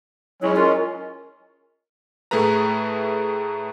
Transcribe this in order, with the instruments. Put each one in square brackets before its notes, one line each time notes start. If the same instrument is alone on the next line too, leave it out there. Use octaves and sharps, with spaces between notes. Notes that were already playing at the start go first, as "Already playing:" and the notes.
[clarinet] F#3 [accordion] G#3 C#4 [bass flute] E4
[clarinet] F4 [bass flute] A#4
[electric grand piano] A2 A3 G#4 A4 B4 A#5